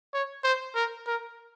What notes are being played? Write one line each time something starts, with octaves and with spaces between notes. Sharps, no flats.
C#5
C5
A#4
A#4